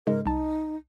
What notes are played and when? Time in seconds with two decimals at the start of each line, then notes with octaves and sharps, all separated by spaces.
0.07 G#2 C#3 G#3 A#4
0.26 C2 D#4 A5